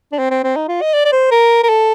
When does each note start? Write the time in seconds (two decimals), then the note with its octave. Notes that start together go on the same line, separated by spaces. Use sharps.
0.12 D4
0.18 C4
0.30 C4
0.43 C4
0.56 D#4
0.68 F4
0.81 D#5
0.94 D5
1.05 D5
1.12 C5
1.31 A#4
1.63 A#4
1.69 A4